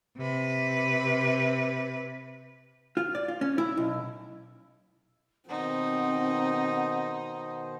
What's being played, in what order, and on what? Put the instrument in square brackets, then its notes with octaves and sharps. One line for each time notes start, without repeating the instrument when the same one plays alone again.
[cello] C3 B4
[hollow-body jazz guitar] F4
D5
F4
C#4
E4
B1
[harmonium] B2 D#3 C5 [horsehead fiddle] C4 [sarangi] D#4 [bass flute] F#5